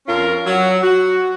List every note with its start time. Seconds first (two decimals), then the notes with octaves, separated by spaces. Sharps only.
0.06 F2 C#4 F4 A#4
0.46 F#3
0.83 F#4